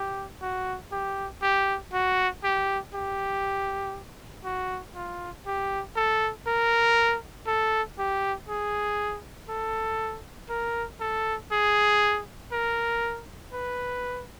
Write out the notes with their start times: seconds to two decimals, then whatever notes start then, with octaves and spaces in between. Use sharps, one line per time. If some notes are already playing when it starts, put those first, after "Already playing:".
Already playing: G4
0.42 F#4
0.92 G4
1.42 G4
1.93 F#4
2.44 G4
2.94 G4
4.44 F#4
4.95 F4
5.46 G4
5.96 A4
6.46 A#4
7.47 A4
7.98 G4
8.48 G#4
9.49 A4
10.50 A#4
11.00 A4
11.51 G#4
12.52 A#4
13.53 B4